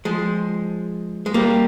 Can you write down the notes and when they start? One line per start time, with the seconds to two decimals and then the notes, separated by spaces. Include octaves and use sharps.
0.05 F3 G#3
1.26 G#3
1.34 G3 A#3